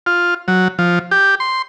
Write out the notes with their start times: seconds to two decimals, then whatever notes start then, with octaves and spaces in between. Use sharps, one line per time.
0.06 F4
0.48 F#3
0.79 F3
1.11 G4
1.40 C6